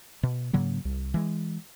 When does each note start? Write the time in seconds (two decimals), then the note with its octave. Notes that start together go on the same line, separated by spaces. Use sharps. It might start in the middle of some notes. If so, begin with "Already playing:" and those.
0.23 B2
0.53 G#2 C#3 F#3 A#3
0.85 C2
1.14 E3 G#3